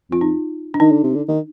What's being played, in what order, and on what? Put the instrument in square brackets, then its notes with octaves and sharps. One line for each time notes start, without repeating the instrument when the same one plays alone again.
[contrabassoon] F2 [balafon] F4
[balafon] D#4
D4
[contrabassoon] D#3 [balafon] D#4
[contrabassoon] D3
C3
D3
D#3